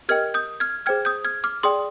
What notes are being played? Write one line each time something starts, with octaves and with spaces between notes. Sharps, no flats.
G4 A#4 D#5 G5 F6 G#6
D#6 G6
F6 G#6
G#4 C5 G5 F6 G#6
D#6 G6
F6 G#6
D6 F6
G#4 D5 G5 C6 D#6